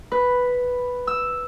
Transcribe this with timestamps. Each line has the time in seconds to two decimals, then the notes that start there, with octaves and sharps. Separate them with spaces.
0.12 B4
1.07 E6